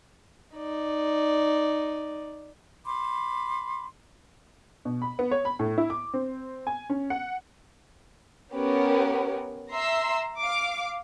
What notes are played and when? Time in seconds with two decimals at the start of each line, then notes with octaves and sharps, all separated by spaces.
0.56 D#4 D5
2.86 B5 C6 D6
4.85 B2
5.02 B5
5.19 B3
5.31 C#5
5.45 B5
5.59 A2
5.78 E4
5.90 D6
6.14 C4
6.67 G#5
6.90 C#4
7.10 F#5
8.52 B3 C#4 G4 A#4 C#5
9.71 E5 A#5 C6 E6
10.39 F5 D6